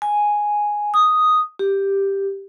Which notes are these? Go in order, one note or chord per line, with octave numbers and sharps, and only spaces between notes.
G#5
D#6
G4